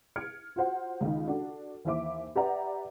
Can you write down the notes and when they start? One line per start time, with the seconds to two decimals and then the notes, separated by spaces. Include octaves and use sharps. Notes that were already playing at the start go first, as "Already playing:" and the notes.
0.16 F6 G#6 C#7 D7
0.56 F4 F#4 C5 F#5
1.01 C#2 D#3
1.28 D4 F#4 A4
1.85 D#2 E3 C5 E5 D6
2.36 G4 B4 D5 E5 F#5 A#5